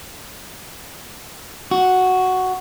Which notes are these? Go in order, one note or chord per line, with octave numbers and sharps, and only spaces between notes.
F#4